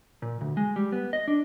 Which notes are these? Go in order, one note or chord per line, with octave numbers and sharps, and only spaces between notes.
A#2
D2
G#3
G3
B3
D#5
D4